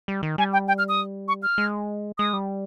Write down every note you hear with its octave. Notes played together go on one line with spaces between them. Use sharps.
G3
D#3
G3 G#5
G5
G5
F6
D#6
C#6
F6
G#3
G#3 D#6
G3